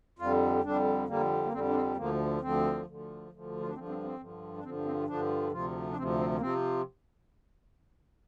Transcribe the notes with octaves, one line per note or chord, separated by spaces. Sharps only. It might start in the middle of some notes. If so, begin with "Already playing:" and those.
F2 D3 G3 F4
F2 D3 G3 D4
F2 D3 G3 A#3
A#3
F2 D3 G3 C4
D4
C4
D2 D3 F3 A#3
D2 D3 F3 C4
D2 D3 F3
D2 D3 F3
F4
D4
G2 D3 F3 C4
C4
C4
G2 D3 F3
D4
G2 D3 F3 C4
C4
G2 D3 F3 D4
D2 C3 F3 F4
D4
D2 C3 F3 C4
C4
A#3
C3 F3 C4